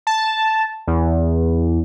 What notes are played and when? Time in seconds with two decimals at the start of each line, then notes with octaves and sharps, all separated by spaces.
0.07 A5
0.87 E2